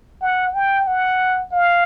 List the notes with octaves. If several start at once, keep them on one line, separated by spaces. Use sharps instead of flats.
F#5
G5
F#5
F5